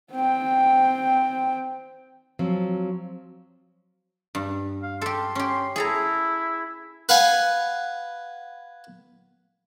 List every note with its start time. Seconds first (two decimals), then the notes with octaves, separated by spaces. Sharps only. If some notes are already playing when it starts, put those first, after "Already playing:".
0.12 C4 G5
2.39 F3 F#3 C4
4.35 G2
4.82 F5
5.01 G4 A4 C6
5.35 C#4 G4
5.76 E4 G#4 A4 A#5
7.09 B4 F5 F#5 G#5